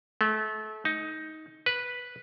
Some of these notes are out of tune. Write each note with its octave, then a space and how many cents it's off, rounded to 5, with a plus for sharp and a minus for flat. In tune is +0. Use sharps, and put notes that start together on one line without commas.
A3 -30
D#4 +15
B4 -5